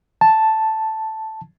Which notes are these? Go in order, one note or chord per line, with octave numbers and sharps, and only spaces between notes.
A5